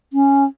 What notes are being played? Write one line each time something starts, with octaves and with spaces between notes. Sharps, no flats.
C#4